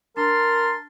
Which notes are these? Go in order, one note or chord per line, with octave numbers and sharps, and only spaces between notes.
D4 A#4 A5 C6